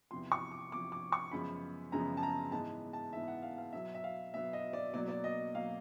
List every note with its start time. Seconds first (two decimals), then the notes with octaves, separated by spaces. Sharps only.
0.11 E2 C3 F3 C6
0.32 C#6
0.51 D6
0.71 E2 C3 F3 D6
0.92 D6
1.12 C#6
1.31 F#2 C#3 F3 G#3 B3 B5
1.92 F#2 C#3 F3 G#3 B3 A#5
2.17 A5
2.23 A#5
2.52 G#2 E3 G#3 B3 A5
2.93 A5
3.12 G#2 E3 G#3 B3 E5
3.28 F#5
3.42 F5
3.57 F5
3.73 B2 F#3 B3 E5
3.95 E5
4.04 F5
4.34 B2 F#3 B3 E5
4.53 D#5
4.73 D5
4.93 B2 F#3 A#3 D5
5.08 D5
5.24 D#5
5.54 B2 F#3 A#3 F5